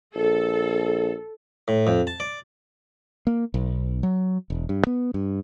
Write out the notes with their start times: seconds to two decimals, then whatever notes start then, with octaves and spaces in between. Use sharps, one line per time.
0.16 A#1 A4
1.68 A2
1.87 F2
2.07 A5
2.20 D5
3.27 A#3
3.54 B1
4.03 F#3
4.50 E1
4.69 G2
4.87 B3
5.14 G2